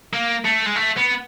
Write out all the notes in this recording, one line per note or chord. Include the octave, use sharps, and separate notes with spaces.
A#3
A3
G#3
A3
B3